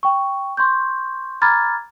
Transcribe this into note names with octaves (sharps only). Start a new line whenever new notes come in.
G5 C#6
C6 C#6 G6
A#5 B5 D6 F6 G#6 A6